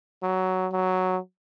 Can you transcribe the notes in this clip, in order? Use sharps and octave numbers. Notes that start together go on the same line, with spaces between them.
F#3
F#3